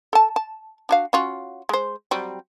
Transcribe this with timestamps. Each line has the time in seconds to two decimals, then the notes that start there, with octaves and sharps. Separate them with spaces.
0.13 A4 A5
0.36 A5
0.89 D4 F#4 F5
1.13 C#4 F4 F#4
1.69 G#3 C5
2.11 F#3 G3 C4